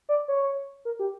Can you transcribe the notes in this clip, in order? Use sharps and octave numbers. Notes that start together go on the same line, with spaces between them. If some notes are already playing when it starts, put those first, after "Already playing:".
D5
C#5
A#4
G4